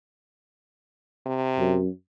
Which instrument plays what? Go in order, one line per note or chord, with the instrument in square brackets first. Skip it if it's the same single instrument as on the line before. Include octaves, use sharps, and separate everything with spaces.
[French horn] C3
[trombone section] F#2